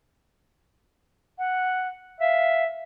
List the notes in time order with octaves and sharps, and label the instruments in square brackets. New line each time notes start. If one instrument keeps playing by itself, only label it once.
[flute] F#5
[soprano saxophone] E5 [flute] F5